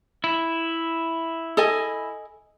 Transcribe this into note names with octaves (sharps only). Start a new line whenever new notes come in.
E4
A4 D#5 G#5